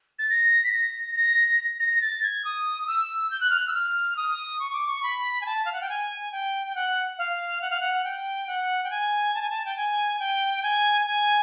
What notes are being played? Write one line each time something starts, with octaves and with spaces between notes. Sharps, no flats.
A6
A#6
B6
A#6
A#6
A#6
A6
G#6
D#6
E6
G6
F#6
F6
F#6
E6
F6
D#6
C#6
D6
C#6
B5
G#5
A5
F5
F#5
G5
G#5
G5
G5
F#5
F5
F#5
F5
F#5
G5
F#5
G5
G#5
A5
G#5
A5
G5
G#5
G5
G#5
G#5